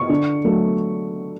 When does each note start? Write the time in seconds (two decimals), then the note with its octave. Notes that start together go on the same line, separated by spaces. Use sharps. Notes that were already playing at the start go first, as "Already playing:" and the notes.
Already playing: C#6
0.09 D3
0.44 F#3 A3